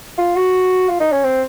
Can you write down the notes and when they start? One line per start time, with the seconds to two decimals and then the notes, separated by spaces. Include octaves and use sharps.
0.18 F4
0.36 F#4
0.89 F4
1.00 D#4
1.12 C#4
1.24 C4